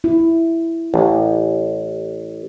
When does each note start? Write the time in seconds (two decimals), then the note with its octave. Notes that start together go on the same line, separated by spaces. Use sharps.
0.04 E4
0.94 A1 E3